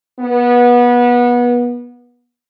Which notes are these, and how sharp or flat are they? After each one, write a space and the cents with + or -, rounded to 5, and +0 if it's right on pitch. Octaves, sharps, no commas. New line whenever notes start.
B3 -25